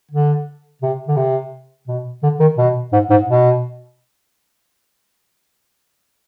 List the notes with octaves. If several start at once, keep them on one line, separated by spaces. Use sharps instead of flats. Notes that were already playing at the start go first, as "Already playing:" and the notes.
D3
C3
D3
C3
B2
D3
D#3
B2
G#2
G#2
B2